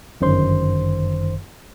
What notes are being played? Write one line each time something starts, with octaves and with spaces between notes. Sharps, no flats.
G1 F#2 D#3 C5 C6